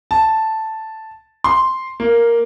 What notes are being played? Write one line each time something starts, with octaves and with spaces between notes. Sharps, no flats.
A5
C6
A#3